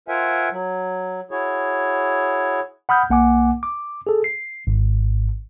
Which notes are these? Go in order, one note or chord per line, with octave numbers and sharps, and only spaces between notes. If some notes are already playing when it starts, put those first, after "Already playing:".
F4 A#4 C5 E5 F#5 G#5
F#3
E4 F#4 G#4 C#5
F#5 B5 D#6 F6 G6
B1 A#3 F#5 G#5 D6
D6
G#4 A4
C7
G#1 G#2